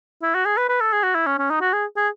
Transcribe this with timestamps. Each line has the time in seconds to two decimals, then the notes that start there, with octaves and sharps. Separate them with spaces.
0.22 E4
0.35 F#4
0.45 G#4
0.57 B4
0.69 B4
0.81 A4
0.93 G#4
1.03 F#4
1.15 E4
1.26 C#4
1.38 C#4
1.50 D#4
1.61 F#4
1.73 G#4
1.96 G#4